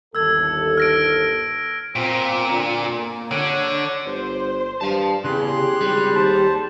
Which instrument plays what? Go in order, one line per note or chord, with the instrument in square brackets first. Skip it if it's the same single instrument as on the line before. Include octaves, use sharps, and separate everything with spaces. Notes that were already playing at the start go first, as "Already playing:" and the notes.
[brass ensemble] G1 D#2 A4 [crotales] E6 G#6
[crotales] F6 A#6 D7
[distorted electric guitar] A#2 [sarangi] C4
[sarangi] D3
A#3
[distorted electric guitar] D3 [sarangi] C#5
[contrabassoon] G1 [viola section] C5
[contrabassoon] G2 [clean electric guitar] F5 A5
[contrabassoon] E2 [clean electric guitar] C#3 [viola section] G4 G#4 [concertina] C6 F#6
[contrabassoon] G#1 [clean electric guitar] G3
[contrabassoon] D#2 [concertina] C5 A5